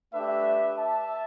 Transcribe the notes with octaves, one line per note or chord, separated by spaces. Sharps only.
A3 D4 G4 B4 E5
E5 A5